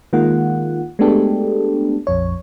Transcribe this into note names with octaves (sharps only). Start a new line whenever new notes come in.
D#3 G#3 A#3 F4 F#5
G#3 A3 B3 D4 G4 A4
A#1 F2 C#5